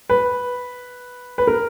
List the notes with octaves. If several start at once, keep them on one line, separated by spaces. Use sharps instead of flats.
B4
B4
A#4